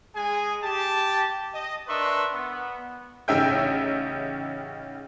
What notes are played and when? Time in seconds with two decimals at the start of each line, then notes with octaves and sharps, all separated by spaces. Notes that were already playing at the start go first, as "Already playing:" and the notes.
0.15 G#3 G#4 G#5
0.63 G4 A5
1.54 D#5
1.88 D4 A#4 B4 E5 C6 C#6
2.33 B3
3.28 A1 C#3 D#4 E5 G5 G6